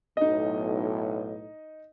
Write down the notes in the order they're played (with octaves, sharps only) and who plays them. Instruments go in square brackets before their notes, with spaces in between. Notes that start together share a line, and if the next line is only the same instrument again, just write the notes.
[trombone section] B1 A2 [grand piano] D#4 D#5